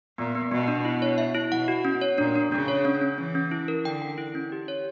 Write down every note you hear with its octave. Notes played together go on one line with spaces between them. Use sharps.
A#2 B3
B3
B2 B3
D4
E4
C#5
E5
E4
B2 F#5
F#4
C#4
C#5
A#2 D4
D4
C#3 D4
C#5
C#4
C#4
E3 C#4
C#4
E4
A#4
D3 G5
G5
E4
C#4
G4
C#5